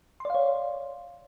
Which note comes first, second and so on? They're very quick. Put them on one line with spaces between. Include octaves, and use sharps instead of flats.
C6 D5 F5 C#5